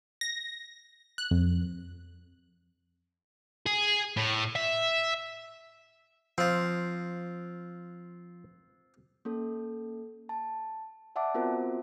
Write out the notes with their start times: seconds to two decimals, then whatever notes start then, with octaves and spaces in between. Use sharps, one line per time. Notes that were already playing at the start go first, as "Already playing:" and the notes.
0.21 A#6
1.18 F#6
1.31 F2
3.66 G#4
4.17 A2
4.56 E5
6.38 F3 C4 F4
9.25 A#3 C#4 A4
10.29 A5
11.16 D5 E5 F#5 A5 D6
11.34 B3 C4 F4 F#4 A#4 C5